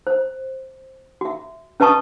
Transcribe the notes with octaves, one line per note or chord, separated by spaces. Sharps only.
C5
F#4 E5
C#4 B4 D#5 A5 C#6 D#6